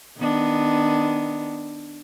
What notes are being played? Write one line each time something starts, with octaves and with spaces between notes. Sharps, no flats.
D#3 B3 D4